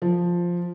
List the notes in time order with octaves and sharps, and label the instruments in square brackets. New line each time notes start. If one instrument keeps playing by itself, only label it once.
[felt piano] F3